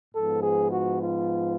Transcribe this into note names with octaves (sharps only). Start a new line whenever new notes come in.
G#2 F3 B3 A4
G#4
F#4
F4